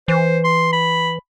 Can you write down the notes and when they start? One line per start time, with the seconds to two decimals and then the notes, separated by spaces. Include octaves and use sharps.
0.08 E3 C5
0.44 C6
0.73 B5